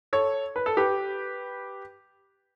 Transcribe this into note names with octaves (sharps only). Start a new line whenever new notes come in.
A4 C#5
B4
A4
G4 B4